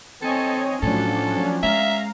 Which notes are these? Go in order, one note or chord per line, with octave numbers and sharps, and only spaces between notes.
C4 A4 C#5 D#5 G#5
A2 F3 F#3 C#4 D4 A4
G#3 E5 F5 A#5